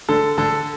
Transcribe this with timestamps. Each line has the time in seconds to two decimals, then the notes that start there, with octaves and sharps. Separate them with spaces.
0.09 D3 A4
0.38 D3 A4